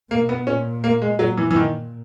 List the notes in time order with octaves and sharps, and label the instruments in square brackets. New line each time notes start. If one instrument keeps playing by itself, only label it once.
[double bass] B2 [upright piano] A#3
[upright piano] B3
[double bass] A#2 [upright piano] C#4
[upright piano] A#3
G#3
[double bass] A#2 [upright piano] F#3
[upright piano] E3
E3
D#3